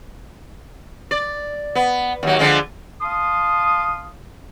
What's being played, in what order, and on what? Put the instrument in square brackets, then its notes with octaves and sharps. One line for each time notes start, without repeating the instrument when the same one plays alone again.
[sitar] D5
B3
D#2 F#3
D3 F3 G#3
[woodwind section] F5 A5 C6 D#6